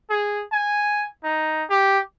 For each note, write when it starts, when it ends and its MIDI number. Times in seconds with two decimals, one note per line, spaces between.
0.10 0.43 68
0.52 1.07 80
1.24 1.64 63
1.70 2.00 67